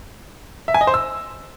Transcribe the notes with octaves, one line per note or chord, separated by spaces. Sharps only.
E5
G#5
D#5
C5
E6